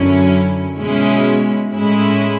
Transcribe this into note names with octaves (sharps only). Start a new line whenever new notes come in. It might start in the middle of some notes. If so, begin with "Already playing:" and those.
Already playing: F#2 D3 F#3 C#4 E4
B2 G#3 C#4 E4
A2 G#3 C#4 E4